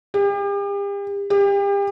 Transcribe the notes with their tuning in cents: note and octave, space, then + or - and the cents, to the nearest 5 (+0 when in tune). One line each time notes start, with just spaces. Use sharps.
G4 +40
G4 +35